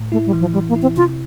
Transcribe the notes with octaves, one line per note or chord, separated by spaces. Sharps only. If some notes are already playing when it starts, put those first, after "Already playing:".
Already playing: A2
A3 E4
G3
E3
F3
E3 G3
A#3
E4
C4
C3 F4